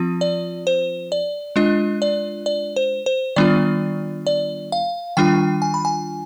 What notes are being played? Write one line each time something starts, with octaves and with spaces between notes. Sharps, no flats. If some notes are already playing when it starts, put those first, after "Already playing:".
Already playing: F3 C4 F4
D5
C5
D5
G#3 D4 F4 D#5
D5
D5
C5
C5
D#3 G3 B3 D4 F4 D5
D5
F5
D#3 G3 D4 F4 G5
G#5
B5
G#5